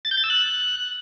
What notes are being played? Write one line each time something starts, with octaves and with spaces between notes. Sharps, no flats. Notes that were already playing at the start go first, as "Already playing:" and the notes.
A6
G6
A6
E6
F#6